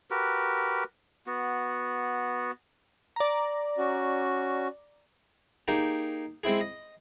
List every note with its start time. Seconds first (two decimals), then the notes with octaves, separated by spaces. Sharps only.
0.11 F#4 G4 A#4 B4
1.27 B3 F#4
3.16 D5 A#5
3.78 C#4 F#4
5.68 A#3 D#4 G4 G#4
6.44 G#3 C4 E4 G#4
6.61 D#5